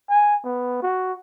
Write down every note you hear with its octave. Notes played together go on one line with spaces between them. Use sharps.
G#5
B3
F#4